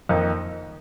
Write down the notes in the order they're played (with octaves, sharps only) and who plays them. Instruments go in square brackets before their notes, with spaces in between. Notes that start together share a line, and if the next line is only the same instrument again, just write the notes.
[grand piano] F2 D#3 A#3 D#4